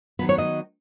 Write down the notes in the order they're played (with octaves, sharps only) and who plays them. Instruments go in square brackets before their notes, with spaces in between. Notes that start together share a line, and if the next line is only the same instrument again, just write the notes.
[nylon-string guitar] D#3 F#3 B3 B4
C#5
D#5